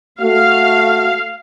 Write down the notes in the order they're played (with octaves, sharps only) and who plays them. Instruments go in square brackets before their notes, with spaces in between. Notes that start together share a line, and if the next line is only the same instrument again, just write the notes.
[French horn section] A3 F#4 [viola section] F5